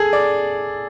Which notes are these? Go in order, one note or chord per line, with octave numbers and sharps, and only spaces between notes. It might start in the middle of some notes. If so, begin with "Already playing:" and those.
Already playing: G#4 A4
D5